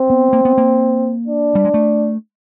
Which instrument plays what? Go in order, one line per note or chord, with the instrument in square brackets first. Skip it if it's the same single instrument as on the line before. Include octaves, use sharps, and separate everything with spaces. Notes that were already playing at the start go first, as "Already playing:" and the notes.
Already playing: [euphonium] C4
[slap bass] B3
A#3
B3
A#3
[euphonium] D4
[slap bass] G3
G#3
A3